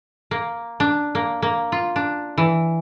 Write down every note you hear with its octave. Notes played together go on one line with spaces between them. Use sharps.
A#3
D4
A#3
A#3
F4
D4
E3